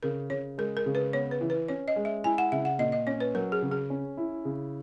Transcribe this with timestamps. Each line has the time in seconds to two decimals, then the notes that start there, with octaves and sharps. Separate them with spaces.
0.03 C#3 A#4
0.30 C#3 C#5
0.58 G#3 A#4
0.77 A#4
0.86 C#3
0.95 B4
1.13 B3 C#5
1.31 B4
1.41 E3
1.50 B4
1.68 C#4 C#5
1.88 D#5
1.96 G#3
2.05 E5
2.24 E4 G#5
2.38 F#5
2.52 C#3 E5
2.65 F#5
2.79 A#2 D#5
2.92 D#5
3.07 C#4 C#5
3.20 B4
3.35 F#3 A#4
3.52 G#4
3.62 C#3
3.72 G#4
3.90 C#4
4.17 E4
4.45 C#3